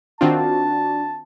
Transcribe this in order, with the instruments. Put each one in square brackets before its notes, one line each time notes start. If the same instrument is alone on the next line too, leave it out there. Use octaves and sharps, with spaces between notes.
[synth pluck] D#3 C4 F4 [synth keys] D4 F#4 [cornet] A5